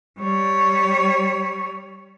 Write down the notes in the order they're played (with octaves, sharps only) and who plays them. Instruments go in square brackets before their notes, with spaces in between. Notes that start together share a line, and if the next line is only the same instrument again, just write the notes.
[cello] G3 C#5